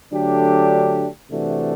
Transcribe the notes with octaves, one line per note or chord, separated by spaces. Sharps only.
D3 F#3 A3 D4 G4
C3 E3 A3 D4 F#4